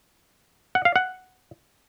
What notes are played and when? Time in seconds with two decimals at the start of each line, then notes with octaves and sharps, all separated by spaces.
0.75 F#5
0.85 F5
0.96 F#5